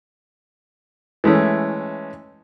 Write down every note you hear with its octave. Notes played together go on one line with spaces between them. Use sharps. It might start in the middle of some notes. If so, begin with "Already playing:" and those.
E3 G#3 A3 C#4